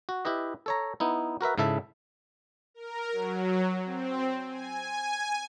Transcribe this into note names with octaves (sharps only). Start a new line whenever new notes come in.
F#4
E4 G4 B4 D#5
A4 C#5 A#5
B3 D#4 E4
F#4 A#4 B4 E5
G#2 C#3 E4 A4 E5 A5
A#4
F#3
C4
G#5